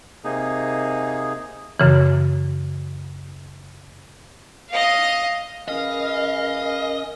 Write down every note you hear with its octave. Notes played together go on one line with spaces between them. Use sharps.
C3 A#3 D#4 G#4
F#2 C#3 E3
D#5 F5
E3 C#4 G#4 A#4 D#5 F5